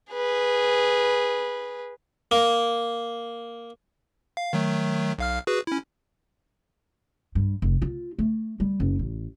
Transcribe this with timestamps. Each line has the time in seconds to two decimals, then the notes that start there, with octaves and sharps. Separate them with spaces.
0.12 G#4 B4
2.31 A#3
4.37 F5
4.53 D#3 F#3 A3
5.18 B1 F5 F6
5.47 F#4 G#4 B4
5.67 C#4 E4
7.35 G2
7.62 F1
7.82 F4
8.19 A3
8.60 G3
8.80 F#1
8.99 A1